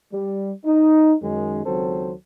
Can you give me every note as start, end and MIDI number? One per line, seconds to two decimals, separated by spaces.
0.13 0.51 55
0.65 1.14 63
1.23 1.63 42
1.23 1.63 51
1.23 1.63 56
1.65 2.12 37
1.65 2.12 51
1.65 2.12 54
1.65 2.12 60
1.65 2.12 69
1.65 2.12 72